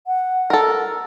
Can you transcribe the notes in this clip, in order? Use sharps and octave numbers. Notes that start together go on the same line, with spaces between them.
F#5
A4 A#4